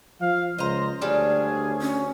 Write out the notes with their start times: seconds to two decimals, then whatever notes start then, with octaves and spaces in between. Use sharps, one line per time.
0.21 F3 F5
0.58 C#2 C5 D#5 A#5 C6
1.01 D2 G3 D4 G#4 C#5 F5 G#5
1.81 C#4